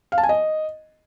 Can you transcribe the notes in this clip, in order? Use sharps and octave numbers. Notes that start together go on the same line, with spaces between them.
F5
A5
G#5
D#5